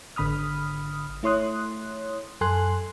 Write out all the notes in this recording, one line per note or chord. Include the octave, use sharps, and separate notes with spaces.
G#1 D3 B5 D#6 F6
A3 E4 C#5 C6 D#6 F#6
F#2 A4 G#5 C6 F#6